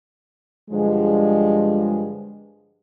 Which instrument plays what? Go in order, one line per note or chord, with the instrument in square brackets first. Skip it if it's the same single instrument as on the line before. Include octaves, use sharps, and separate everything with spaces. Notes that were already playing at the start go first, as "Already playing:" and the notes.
[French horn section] G2 D3 F3 G#3